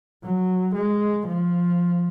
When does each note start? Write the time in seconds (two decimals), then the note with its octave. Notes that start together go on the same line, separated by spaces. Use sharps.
0.24 F#3
0.75 G#3
1.27 F3